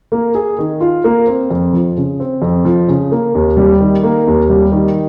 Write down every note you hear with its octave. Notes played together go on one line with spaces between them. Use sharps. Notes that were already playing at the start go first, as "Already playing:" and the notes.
A#3
G#4
D#3
F4
A#3
C4
F2
F3
C#3
C4
F2
F3
C#3
A#3
D#2
G3
D#3
A#3
D#2
G3
D#3